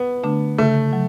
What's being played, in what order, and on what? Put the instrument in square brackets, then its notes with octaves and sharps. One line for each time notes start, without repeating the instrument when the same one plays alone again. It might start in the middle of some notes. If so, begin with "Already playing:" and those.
Already playing: [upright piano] B3
[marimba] D3 A3 D4
[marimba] C#3 [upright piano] A3
[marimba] F#3